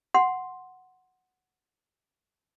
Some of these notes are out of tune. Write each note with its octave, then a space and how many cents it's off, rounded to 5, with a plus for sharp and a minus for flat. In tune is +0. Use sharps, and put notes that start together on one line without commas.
F#5 +0 C6 +0